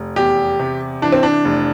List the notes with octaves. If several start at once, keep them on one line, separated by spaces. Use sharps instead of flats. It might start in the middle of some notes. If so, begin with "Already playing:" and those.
Already playing: F1
E2 G4
C3
E3 D4
C4
D4
F1